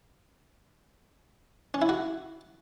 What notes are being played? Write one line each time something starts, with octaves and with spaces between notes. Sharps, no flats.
C#4
E4
F#4